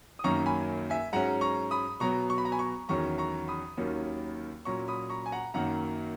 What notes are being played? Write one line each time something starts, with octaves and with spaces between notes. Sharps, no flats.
D#6
F#2 D#3 F#3 A#3 C#4 A#5 C#6
G#5 B5
E5 G#5
G#2 F#3 C#4 F#5 A#5
A#5 C#6
B5 D#6
B2 F#3 B3 A#5 C#6
C#6
B5
A#5
G#5 B5
A#5 C#6
E2 D#3 F#3 C#4 A#5 C#6
A#5 C#6
B5 D#6
D#2 D#3 F#3 A#3 C#4
A#2 F#3 C#4 A#5 C#6
B5 D#6
A#5 C#6
G#5
F#5 A#5
F#2 D#3 F#3 A#3 F#5 A#5